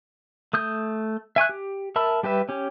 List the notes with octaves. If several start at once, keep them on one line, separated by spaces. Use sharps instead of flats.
A3 D#6 G6
E5 G#5 C#6 F#6
G4
A#4 E5 A5 B5 E6
G3 G4 B4 E5
C#4 G4